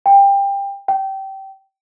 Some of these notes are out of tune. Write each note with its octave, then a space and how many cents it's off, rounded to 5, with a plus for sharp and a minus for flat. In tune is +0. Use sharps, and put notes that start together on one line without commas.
G5 +20
G5 -20